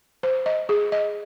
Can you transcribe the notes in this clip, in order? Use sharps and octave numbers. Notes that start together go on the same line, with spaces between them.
C5
D#5
G#4
D#5